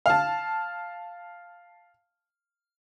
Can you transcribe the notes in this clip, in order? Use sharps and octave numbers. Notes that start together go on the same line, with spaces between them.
F5 A5